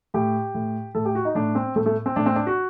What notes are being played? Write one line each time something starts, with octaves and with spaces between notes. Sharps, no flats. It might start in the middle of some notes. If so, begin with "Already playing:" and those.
A2 G4
A2
A2 A4
G4
F#4
D#4
A2 D4
C4
A2 A3
A3
C4
A2 D4
C4
D4
F#4